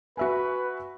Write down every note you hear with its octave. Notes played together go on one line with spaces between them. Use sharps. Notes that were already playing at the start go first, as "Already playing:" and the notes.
F#4 B4 E5 G#5